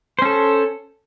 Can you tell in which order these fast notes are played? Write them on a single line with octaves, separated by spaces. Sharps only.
C5 C#4 A4